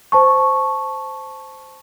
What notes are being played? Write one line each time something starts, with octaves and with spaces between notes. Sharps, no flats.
C5 A5 C#6